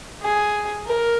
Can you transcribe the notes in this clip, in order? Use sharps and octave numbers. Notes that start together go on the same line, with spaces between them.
G#4
A#4